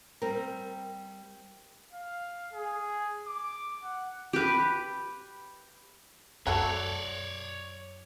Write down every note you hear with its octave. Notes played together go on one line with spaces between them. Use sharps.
G3 C4 A#4
F5
G#4
D6
F#5
G4 B4
F#2 F#3 A3 A4 C#5 D5